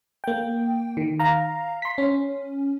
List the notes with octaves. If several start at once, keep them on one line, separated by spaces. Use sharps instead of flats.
A#3 G5
D#3
F5 A#5
C6 B6
C#4